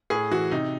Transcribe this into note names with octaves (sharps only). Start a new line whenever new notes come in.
A2 G#4
E3 F#4
C3 D#4